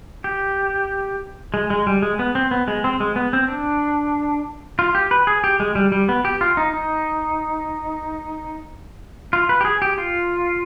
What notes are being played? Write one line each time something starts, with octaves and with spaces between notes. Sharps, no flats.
G4
G#3
G#3
G3
G#3
B3
C4
B3
G#3
C4
G#3
B3
C4
D4
F4
G4
B4
G#4
G4
G#3
G3
G3
B3
G4
F4
D#4
D#4
F4
B4
G4
G#4
G4
F4